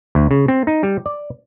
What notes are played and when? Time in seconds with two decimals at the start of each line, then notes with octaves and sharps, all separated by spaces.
0.15 D2
0.31 C#3
0.48 C4
0.67 D#4
0.83 G3
1.06 D5